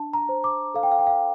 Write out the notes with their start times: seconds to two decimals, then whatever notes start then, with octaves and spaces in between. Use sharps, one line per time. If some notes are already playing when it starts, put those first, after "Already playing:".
Already playing: D4 A5
0.13 A#5
0.29 C5
0.44 D6
0.74 A4 F5
0.83 G5
0.92 F5
0.99 G5
1.07 F5